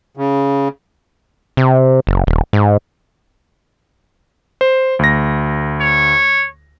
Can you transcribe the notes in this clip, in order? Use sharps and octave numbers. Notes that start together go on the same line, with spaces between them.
C#3
C3
F#1
D#1
G#2
C5
D2 A#6
C#5